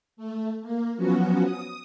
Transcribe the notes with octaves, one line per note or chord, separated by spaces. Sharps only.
A3
A#3
F3 F#3 B3 C#4 F#4
D#6